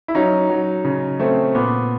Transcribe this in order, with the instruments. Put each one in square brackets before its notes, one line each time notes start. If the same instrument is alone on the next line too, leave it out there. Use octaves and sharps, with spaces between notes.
[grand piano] E4
F#3 C#4 D#4
F#3
C#3
A3 C4
A#2 B3